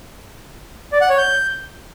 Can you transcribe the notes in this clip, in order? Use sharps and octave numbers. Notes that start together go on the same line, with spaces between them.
D5
F#5
C#5
G6